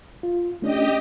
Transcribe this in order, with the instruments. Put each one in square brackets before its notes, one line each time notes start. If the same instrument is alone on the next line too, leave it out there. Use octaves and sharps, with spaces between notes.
[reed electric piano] F4
[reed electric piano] A3 C#4 D4 [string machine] G4 D#5